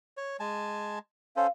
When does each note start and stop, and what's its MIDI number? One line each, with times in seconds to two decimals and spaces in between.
0.17 0.37 73
0.40 0.99 56
0.40 0.99 80
0.40 0.99 81
1.37 1.47 61
1.37 1.47 69
1.37 1.47 72
1.37 1.49 77